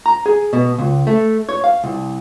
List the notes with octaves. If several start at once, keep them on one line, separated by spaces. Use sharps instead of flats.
A#5
G#4
B2
C#2
A3
C#5
F5
C2